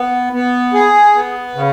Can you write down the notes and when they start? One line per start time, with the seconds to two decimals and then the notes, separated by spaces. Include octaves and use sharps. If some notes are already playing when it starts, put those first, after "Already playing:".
Already playing: B3
0.33 B3
0.74 G#4
1.15 B3
1.55 C#3